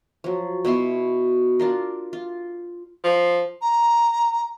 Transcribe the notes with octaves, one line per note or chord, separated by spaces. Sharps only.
F3 F#3
B2 B3 E4 C6
D4 F4 A#4
F4
F3
A#5